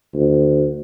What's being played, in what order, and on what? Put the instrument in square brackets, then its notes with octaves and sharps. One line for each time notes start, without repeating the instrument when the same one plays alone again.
[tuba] D2